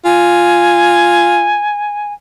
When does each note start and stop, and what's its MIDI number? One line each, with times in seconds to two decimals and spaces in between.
0.05 1.59 65
0.05 2.13 80